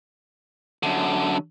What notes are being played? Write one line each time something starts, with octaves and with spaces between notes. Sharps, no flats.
F#2 D3